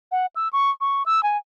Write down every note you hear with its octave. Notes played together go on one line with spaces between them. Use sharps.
F#5
E6
C#6
C#6
E6
G#5